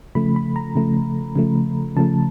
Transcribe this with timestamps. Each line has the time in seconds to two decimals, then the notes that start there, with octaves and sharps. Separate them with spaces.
0.15 C#3 F3 A3 B5
0.36 B5
0.56 A#5
0.75 C#3 F3 A3
1.36 C#3 F3 A3
1.97 C#3 F3 A3 A5